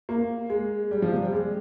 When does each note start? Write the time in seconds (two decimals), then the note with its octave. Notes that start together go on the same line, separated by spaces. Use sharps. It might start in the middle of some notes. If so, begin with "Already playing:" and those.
0.09 A#3
0.50 G#3
0.91 G3
1.02 F3
1.12 C3
1.22 G3
1.32 G#3